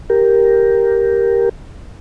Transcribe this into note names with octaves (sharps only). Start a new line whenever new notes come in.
G4 A#4